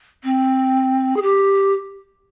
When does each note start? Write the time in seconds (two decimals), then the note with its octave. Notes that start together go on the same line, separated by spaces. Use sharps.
0.23 C4
1.16 G#4
1.22 G4